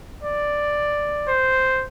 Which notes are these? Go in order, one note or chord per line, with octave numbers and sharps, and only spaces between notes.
D5
C5